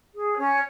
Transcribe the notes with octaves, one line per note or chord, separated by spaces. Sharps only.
G#4
C#4 C#5